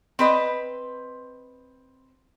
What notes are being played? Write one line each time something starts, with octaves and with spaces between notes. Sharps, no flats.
C4 B4 D#5